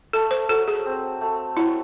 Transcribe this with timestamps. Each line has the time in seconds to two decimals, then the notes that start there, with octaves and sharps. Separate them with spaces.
0.13 A3 A4
0.31 C5
0.49 F#3 A4
0.68 G#4
0.85 C4
1.21 A3
1.57 F#3 E4